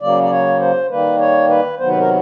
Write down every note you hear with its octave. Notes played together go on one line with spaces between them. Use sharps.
C#3 F#3 A#3 D5
D5
C#5
C5
D#3 G3 A#3 B4
C#5
B4
C3 D#3 F#3 B3 C5
B4
A#4